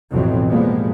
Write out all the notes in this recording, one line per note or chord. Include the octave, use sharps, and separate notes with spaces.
A1 F2 B2 E3 F#3 C4
A2 F3 G3 G#3 A#3 B3